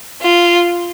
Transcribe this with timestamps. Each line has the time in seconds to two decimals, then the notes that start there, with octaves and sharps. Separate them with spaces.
0.22 F4